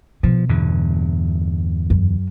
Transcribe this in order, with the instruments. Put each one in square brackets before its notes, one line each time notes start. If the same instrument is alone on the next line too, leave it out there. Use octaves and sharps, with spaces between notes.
[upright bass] B2 [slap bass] F3
[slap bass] E2 G2 D3
[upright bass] F#2